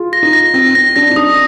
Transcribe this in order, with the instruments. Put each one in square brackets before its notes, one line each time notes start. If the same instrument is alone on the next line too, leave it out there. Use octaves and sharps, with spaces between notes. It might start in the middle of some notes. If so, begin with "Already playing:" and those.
Already playing: [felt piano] F4 G#4
[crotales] A#6
[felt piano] D#4
[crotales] A#6
[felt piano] C4 [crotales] A#6
[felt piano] C4 [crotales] A#6
[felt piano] D4 [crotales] A#6
[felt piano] D#4
[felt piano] D4 [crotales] D#6